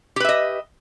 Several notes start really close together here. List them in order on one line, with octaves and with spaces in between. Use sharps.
G4 B4 E5 D#5